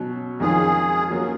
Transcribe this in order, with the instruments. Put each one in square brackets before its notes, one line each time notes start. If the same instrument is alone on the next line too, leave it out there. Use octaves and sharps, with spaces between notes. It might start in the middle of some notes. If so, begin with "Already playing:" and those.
Already playing: [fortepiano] B2 F#3 C#4 F#4
[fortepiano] F2 D#3 G#3 C#4 F4 [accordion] G#4
[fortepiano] F#3 A#3 C#4 F4